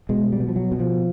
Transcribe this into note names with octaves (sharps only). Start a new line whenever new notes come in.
B2 G#3
G3
B2
F3
F#3
B2
F3